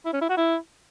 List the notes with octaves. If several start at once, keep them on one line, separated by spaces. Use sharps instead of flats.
E4
C#4
E4
F#4
E4